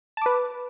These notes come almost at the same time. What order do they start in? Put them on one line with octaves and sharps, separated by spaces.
A5 D6 B4